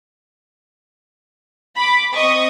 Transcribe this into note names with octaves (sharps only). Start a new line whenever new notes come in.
B5 D6
C4 D#5 C#6 D#6